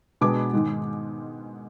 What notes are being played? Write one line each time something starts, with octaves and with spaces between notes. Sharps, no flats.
B2 G#3 B3 D4 D6
G#2 D#3 G#3